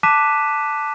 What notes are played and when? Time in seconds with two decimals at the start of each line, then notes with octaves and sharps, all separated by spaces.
0.03 A5 D6 F#6 B6 D#7 E7